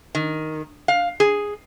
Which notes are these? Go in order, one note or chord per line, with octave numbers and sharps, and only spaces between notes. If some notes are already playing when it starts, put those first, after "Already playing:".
D#3
F5
G#4